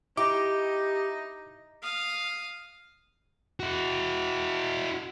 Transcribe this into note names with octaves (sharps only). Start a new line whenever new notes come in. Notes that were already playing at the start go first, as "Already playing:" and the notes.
D#4 E4 G4 D6
F5 D#6
E4 F#4